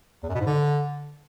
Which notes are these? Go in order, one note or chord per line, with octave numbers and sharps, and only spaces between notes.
E2
F#2
B2
G#2
D3